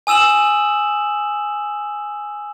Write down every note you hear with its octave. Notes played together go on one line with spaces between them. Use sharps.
G#5 D#6 E6 E7 F#7